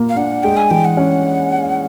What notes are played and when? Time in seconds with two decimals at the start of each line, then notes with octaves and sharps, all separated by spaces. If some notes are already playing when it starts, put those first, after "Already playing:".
Already playing: A#2 A#3
0.09 F5
0.16 D4 F#5
0.43 G#3 G5
0.57 G#5
0.71 E3 G5
0.85 F#5
0.97 C#4